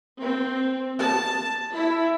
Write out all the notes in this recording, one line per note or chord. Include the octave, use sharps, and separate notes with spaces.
C4
A5
E4